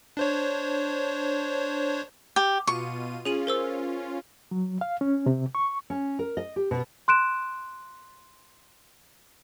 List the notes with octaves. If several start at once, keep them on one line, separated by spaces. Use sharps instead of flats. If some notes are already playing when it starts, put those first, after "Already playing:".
D4 C5 C#5
G4
B2 F4 C#6 D#7
C#4 F4 G#4 D#7 F#7
A#4 C5 E6
F#3
F5
C#4
C3
C#6
C#4
A#4
D#5
G4
B2
C6 F#6 D7 E7